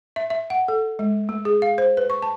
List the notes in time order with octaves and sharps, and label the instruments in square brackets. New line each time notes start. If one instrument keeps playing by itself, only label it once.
[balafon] E5
E5
F#5
A4
G#3
A3
G#4
F5
C5
B4
C#6
A5